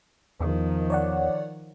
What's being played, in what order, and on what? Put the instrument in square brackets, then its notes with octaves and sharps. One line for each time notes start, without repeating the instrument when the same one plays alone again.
[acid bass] E2 [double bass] D#3 F3
[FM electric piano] C#5 D5 F#5